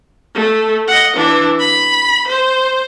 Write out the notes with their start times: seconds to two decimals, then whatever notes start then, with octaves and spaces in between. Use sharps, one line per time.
0.35 A3
0.88 D#5 F#5
1.16 E3 D4
1.60 B5
2.28 C5